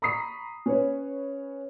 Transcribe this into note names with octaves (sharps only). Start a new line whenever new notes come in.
A#5 B5 C#6 D#6 B6 C7
C#4 B4 C#5